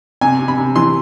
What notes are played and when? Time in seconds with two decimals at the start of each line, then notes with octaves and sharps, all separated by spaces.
0.21 C3 G#5
0.39 C3
0.48 B5
0.58 C3
0.76 E3 C6